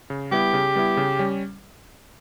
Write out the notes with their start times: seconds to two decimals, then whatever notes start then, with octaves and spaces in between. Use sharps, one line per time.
0.10 C#3
0.31 G3 B3 E4 G4
0.53 C#3
0.75 G3 B3 E4
0.97 C#3
1.19 G3 C#4